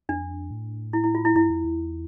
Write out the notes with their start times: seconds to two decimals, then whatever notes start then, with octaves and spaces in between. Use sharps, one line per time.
0.09 F2 D4
0.50 A2
0.93 E4
1.04 E4
1.15 F4
1.25 E4
1.35 G2 E4
1.50 F2
1.64 E2